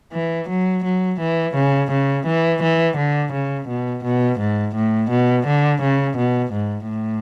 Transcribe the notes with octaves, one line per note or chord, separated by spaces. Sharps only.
E3
F#3
F#3
E3
C#3
C#3
E3
E3
D3
C#3
B2
B2
G#2
A2
B2
D3
C#3
B2
G#2
A2